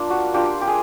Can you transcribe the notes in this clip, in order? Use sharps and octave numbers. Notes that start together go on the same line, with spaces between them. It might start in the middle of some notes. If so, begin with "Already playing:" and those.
Already playing: A#3 D4 F4
F#4
A#3 D4 F4 G4
G4
G#4